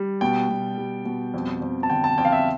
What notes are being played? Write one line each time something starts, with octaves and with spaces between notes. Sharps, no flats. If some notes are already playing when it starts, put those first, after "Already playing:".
Already playing: G3
B2 G5
B2
G3
B2
F2
F2
A5
D3 G5
A5
F2 G5
F5
E5